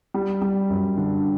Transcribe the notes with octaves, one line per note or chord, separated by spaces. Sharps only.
G3
G3
F#2
D3